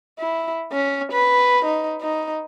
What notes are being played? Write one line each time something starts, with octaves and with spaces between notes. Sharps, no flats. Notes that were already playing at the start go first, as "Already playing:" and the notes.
E4
C#4
B4
D#4
D#4